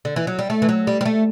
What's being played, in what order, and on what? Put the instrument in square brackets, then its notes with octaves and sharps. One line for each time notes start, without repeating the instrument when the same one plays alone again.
[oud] D3
E3
F#3
G3
A3
E3
F#3
G3
G3
A3